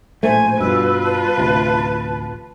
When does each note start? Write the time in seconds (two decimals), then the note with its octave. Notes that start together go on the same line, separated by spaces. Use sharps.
0.23 A#1 A2 A3 C5 G#5
0.60 G2 B2 F4 B4 E6
1.05 A5
1.38 A1 D2 C3